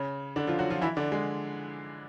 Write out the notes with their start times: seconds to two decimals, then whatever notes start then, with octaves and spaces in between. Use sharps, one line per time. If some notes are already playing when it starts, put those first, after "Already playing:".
Already playing: C#3 C#4
0.36 D3 D4
0.47 F3 F4
0.59 F#3 F#4
0.70 F3 F4
0.81 E3 E4
0.97 D3 D4
1.12 G#3